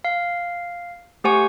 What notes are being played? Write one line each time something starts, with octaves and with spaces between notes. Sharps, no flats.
F5
A3 G4 C5 F#5 G#5 C#6